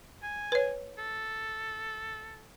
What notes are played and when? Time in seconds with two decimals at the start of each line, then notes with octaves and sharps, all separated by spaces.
0.23 G#5
0.52 B4 C#5
0.98 A4